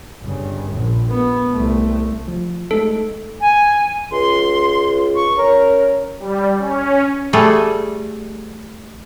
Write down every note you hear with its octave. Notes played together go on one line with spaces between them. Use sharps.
G1 C#3
A#1
B3
C2 A3
F3
G#3 A3 D#4 A4
G#5
C#2 C6
C#6
C#4 A#4
G3
C#4
G3 A3 G#4 A4